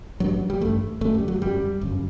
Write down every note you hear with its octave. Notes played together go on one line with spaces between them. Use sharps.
A1 G2 F#3
G3
A1 G2 A3
G1 F#2 A3
G3
F#3
G1 F#2 G3
G1 F#2